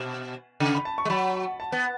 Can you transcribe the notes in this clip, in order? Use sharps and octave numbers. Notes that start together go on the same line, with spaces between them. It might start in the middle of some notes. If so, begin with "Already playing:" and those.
Already playing: B2
C#3
B5
A5
C#6
G#3
F#3 B5
A5
B3